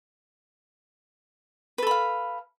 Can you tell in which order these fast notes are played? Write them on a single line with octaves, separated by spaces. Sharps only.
B4 A4 B5 F5